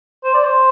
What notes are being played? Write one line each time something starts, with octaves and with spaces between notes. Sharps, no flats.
C5
D5
C5